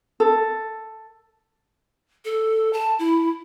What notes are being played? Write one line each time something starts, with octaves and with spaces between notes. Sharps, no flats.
A4
A4
A5
E4